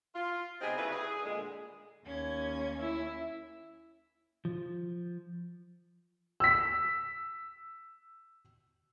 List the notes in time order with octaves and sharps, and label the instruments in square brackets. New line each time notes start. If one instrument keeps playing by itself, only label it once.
[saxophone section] F4
C3 B3 C4 D#4 G#4
C#3 F#3 A3 D4 E4 B4
G#4
A#2 D3 G#3
[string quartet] D#2 C#4 G#6
[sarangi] E4
[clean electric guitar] F3
[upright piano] E6 B6